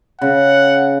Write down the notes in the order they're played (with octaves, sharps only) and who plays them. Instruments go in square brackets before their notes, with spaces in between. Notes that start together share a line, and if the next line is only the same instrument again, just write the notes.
[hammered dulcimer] C#3 [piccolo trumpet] F#5